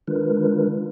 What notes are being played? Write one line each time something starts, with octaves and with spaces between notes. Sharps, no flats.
D#3 G#3 D4 F4 A#4 B4